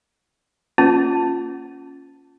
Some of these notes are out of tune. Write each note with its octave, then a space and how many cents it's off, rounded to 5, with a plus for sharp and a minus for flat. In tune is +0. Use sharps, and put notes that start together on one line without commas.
A#3 +0 C#4 +0 F4 +0